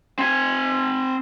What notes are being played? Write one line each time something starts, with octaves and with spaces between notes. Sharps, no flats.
C4 G#5